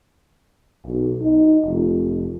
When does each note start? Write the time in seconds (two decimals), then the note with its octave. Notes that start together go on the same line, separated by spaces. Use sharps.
0.87 B1
1.22 D#4
1.66 F1